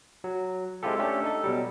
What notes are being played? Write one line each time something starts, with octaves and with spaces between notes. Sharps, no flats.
F#3
G#3 C4 E4 F4 G4 A4
A3 C#4 D4 G4 A4
D#4 A4
B2 F#3 G3